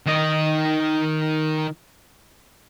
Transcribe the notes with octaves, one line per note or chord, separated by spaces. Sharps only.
D#3 D#5